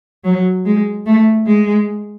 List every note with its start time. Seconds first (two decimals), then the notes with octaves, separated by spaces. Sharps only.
0.24 F#3
0.66 G#3
1.06 A3
1.47 G#3